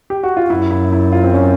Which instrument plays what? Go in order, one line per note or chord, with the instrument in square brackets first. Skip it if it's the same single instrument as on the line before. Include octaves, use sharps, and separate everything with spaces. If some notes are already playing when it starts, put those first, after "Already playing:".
[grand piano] G4
F#4
F4
[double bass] F#2 [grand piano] E4
[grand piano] E4
E4
F4
C4
C#4